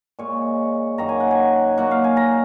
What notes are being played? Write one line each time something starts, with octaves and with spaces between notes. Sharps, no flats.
A#2 G#3 C#5
F#2 D#3 F#3 A#3 A#5
G#5
F#5
G#5
A#2 F#3 A#3 F#5
F5
G#5
A#5